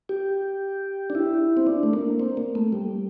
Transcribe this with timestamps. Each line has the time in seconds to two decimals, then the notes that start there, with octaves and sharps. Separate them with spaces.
0.09 G4
1.10 D4
1.15 E4
1.57 C4
1.67 D4
1.83 A3
1.93 A#3
2.20 C4
2.37 A#3
2.55 A3
2.73 G3